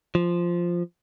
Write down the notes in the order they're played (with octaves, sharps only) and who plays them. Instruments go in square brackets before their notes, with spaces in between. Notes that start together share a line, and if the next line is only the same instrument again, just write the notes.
[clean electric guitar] F3